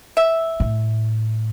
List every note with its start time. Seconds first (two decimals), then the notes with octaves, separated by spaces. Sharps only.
0.17 E5
0.60 A2